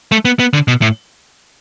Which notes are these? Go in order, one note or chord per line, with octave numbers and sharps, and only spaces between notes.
A3
B3
B3
D3
B2
A2